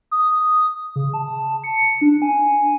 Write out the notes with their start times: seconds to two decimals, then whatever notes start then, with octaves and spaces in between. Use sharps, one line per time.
0.11 D#6
0.96 C#3
1.14 A5
1.64 C#7
2.01 D4
2.22 G#5